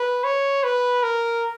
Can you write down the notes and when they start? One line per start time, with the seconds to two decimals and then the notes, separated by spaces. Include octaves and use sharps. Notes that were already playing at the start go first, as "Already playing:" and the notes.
Already playing: B4
0.24 C#5
0.64 B4
1.03 A#4